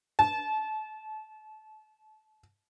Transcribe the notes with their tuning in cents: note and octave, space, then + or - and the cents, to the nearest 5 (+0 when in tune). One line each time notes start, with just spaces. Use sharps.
A5 -30